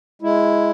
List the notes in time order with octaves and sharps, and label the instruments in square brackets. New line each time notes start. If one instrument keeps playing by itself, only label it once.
[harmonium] G#3 E4